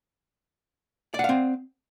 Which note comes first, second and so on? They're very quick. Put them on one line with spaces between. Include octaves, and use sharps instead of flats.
D5 F#5 F5 C4